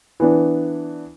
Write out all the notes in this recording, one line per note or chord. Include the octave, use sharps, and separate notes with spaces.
E3 B3 D4